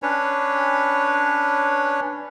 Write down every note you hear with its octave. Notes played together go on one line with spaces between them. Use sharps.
C#4 D4 B4 C#5